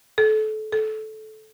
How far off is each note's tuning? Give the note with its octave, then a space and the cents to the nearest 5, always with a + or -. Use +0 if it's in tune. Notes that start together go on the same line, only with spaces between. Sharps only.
A4 -30
A4 -20